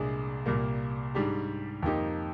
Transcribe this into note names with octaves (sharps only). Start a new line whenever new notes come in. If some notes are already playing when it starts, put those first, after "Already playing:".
Already playing: C2 A#2 G#3 D4 G#4
C2 A#2 G3 A#3
G#2 G3 D4 G4
F2 D#3 A#3 D#4 G4